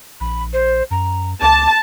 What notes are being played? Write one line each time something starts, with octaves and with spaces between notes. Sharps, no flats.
A#1 B5
C5
F#2 A#5
C#2 A5 D6